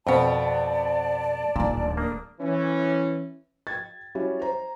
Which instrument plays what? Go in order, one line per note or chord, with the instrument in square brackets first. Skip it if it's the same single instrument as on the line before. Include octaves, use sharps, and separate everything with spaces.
[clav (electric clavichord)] F2 B2 [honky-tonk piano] B3 C4 [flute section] D5 A5
[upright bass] D1 D#3 [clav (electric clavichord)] A#2
[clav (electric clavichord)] A#3 [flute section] D4 D#6
[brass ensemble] E3 C#4
[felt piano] G5 G#6 A6
F#3 G3 C#4 E4 F#4
C5 A#5